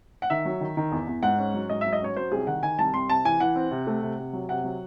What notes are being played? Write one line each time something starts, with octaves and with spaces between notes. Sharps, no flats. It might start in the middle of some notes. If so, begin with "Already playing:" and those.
F#5
D#3 E5
F#3
D#3
D#3
E2
E2
G#2 F#5
C#4
F#3
G#2 D#5
F#3 E5
D#5
C#4 C#5
F#3 C5
C2 G#4
D#3 F#5
D#3 G#5
C2 A5
C2 C6
C3 A5
E3 G#5
E3 F#5
C4
C3
A3
C3
C3
F#3
C3 F#5
F#3